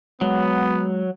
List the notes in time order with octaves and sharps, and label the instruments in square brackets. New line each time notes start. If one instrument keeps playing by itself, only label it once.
[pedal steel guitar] F#3 [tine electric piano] G#3 [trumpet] B3